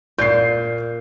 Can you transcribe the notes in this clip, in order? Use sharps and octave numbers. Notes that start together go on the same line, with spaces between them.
A#2 G6 C7